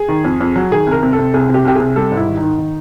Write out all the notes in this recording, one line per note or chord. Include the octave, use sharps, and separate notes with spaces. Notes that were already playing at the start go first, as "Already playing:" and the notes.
Already playing: G#4
D#3
F2
F2
F#3
D#3 G#4
C2
A#4
C3
A4
C3
C2 G#4
C3 G4
C2 G4
C3 G#4
G3 A4
G#2
E4
D#3
D#4
D#3
D#3